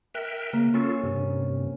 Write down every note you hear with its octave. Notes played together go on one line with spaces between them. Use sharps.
A#4 E5 G5 F#6
C#3 A#3
C#4 F4 A4
G2 C3